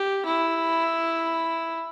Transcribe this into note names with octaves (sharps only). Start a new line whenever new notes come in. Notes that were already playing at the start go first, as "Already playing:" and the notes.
Already playing: G4
E4